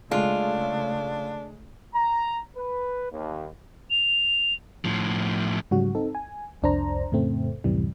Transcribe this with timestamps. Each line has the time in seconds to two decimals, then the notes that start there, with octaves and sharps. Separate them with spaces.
0.11 C#3 G#3 A3 D4 F4
1.94 A#5
2.56 B4
3.11 D#2
3.91 F7
4.85 A2 F3
5.71 G#2 C#3 F#3 G3 F#4
5.95 C4 D#4 A4
6.15 G#5
6.62 C2 F2 D4 C5 A#5
7.12 F2 A2 C#3 A3 C4
7.64 C#2 F#2 A2 C3 E3 G3